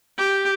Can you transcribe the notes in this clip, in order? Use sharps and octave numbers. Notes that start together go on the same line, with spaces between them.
G4